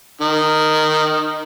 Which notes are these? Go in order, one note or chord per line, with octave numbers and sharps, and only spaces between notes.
D#3